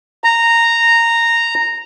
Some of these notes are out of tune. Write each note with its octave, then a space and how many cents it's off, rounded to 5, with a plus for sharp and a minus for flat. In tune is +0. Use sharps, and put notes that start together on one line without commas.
A#5 -10